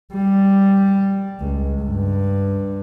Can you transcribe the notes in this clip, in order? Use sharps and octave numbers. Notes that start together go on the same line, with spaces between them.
G3
C#2
G2